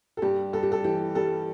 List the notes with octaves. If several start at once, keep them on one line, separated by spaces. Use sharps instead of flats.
A4
G2 G4
G2 A4
G4
A4
E3 G4
G3 A4